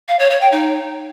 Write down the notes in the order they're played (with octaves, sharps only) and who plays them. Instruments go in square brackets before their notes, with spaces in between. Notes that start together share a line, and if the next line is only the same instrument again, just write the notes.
[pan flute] F5
C#5
C#5
G5
D#4